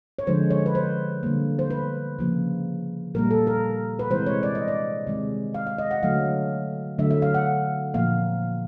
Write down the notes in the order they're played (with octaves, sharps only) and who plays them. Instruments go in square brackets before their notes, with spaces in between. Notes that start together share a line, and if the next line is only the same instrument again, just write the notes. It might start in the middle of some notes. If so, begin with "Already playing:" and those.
[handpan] C#5
D3 F3 G#3 C5
C#5
B4
C5
D3 G3 A#3
C5
B4
C#3 F3 A#3
A#2 G3 A#3 A#4
A4
A#4
B4
C3 E3 G#3 C5
C#5
D5
D#5
D5
C3 D#3 G#3
F5
F5
D#5
F#5
D3 F#3 A3 F5
D3 F#3 A3 E5
E5
F5
F#5
A#2 F3 A#3 F5